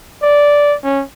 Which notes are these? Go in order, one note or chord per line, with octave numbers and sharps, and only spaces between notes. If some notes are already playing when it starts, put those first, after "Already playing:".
D5
C#4